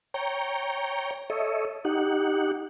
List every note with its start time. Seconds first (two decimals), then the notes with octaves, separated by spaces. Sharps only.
0.14 C#5 G5 A#5
1.30 A4 C#5 D#5 E5
1.85 D#4 G4 F#5